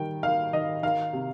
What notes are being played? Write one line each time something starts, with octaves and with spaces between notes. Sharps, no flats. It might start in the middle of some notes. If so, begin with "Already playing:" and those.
Already playing: D#3 G3 G5
D#3 F5
D#3 D#5
D#3 F5
C3